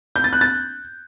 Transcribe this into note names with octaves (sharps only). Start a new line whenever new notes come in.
G6
A6
F#6
A6